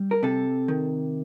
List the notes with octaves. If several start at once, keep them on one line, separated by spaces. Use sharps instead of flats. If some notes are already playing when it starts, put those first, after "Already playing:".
Already playing: G3
A#4
C3 A4
D#3